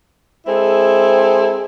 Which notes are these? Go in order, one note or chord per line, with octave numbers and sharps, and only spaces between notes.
G#3 C4 E4 G#4 A4